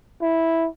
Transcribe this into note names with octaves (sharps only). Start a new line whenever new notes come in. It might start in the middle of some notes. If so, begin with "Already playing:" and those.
E4